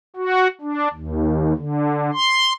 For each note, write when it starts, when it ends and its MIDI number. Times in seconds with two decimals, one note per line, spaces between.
0.16 0.47 66
0.61 0.88 62
0.93 1.53 39
1.56 2.11 50
2.13 2.53 84